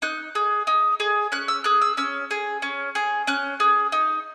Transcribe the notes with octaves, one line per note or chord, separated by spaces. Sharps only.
D#4 F#6
G#4
D#4
G#4
C#4 F#6
E6
G#4 F#6
E6
C#4 E6
G#4
C#4
G#4
C#4 F#6
G#4
D#4